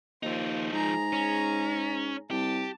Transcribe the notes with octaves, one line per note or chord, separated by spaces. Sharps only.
D#2 F3 D#4 F4 C5
G#2 G#4 A#5
C#4
C2 G4 A5